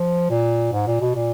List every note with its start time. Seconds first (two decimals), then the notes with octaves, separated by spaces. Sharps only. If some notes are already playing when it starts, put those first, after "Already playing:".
Already playing: F3
0.30 A#2
0.72 G#2
0.87 A#2
1.01 B2
1.16 A#2